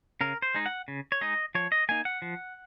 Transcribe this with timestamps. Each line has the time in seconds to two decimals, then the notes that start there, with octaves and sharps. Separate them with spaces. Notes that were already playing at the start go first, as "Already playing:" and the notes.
0.21 C#3 A#4
0.42 C5
0.54 G#3 D#4
0.66 F#5
0.88 C#3
1.12 C#5
1.21 G#3 D#4 D#5
1.55 F3 C#5
1.72 D#5
1.89 A#3 D#4 G#5
2.05 F#5
2.22 F3